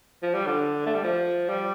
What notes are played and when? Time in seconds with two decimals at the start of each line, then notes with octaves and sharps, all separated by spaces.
0.23 F3
0.34 G3
0.46 D3
0.86 A3
0.94 G3
1.04 F3
1.49 G3